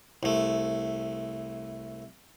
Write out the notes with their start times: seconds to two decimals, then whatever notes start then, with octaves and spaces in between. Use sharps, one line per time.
0.23 C2 A3